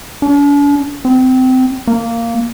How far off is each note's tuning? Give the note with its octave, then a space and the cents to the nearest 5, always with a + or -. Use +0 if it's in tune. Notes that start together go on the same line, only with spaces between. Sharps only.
D4 -45
C4 -25
A#3 -10